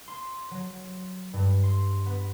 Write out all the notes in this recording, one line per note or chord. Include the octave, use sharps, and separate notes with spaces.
C6
F#3
G2
C6
B3